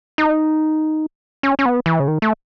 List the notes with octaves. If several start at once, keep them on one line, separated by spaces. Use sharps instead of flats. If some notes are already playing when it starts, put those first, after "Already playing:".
D#4
C#4
C#4
B3
E3
C#3
D#3
A3